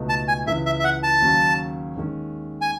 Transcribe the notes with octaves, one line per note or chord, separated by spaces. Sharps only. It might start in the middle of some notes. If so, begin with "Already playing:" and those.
Already playing: C#2 B2 A3 D#4
A5
G#5
C#2 C#3 E3 E5
E5
E5
F#5
A5
D#2 C#3 F#3 C#4
D#2 D#3 G#3 C#4
G#5